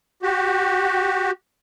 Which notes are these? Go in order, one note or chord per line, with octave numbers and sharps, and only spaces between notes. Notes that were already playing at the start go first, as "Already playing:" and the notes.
F#4 G4